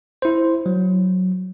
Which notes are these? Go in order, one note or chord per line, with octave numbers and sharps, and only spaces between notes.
E4 C5
F#3